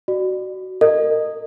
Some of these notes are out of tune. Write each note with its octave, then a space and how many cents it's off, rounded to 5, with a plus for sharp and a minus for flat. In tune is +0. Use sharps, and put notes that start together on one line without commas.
F#4 +10 D5 +30
A#4 -30 D#5 -20